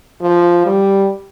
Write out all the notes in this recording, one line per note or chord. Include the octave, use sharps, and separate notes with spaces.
F3
G3